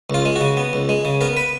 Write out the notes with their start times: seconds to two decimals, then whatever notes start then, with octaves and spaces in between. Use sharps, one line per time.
0.10 C#2 F4
0.25 G#3
0.36 F#4
0.41 C#3
0.57 B3
0.73 C#2
0.89 G#3
1.05 C#3
1.21 B3 A#4
1.37 B4